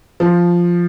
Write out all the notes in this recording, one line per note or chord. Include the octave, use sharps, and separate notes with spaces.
F3